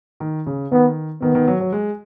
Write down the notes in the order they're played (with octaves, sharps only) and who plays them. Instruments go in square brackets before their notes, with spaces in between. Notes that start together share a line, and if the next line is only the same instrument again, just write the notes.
[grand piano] D#3
C#3
[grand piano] D#3 [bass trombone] B3
[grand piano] D#3 [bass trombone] B3
[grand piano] D#3
F#3
F#3
G#3